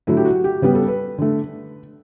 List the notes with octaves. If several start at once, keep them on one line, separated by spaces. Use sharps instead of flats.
D3 F#3 A3 E4
G4
F#4
G4
C#3 G3 B3 B4
A4
B4
D3 A3